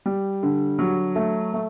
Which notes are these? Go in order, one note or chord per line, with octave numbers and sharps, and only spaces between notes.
G3
D3
F#3
A3
A3